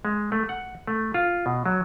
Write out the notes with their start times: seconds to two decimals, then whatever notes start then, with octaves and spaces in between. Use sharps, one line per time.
0.05 G#3
0.32 A3
0.49 F#5
0.87 A3
1.14 F4
1.46 B2
1.66 F#3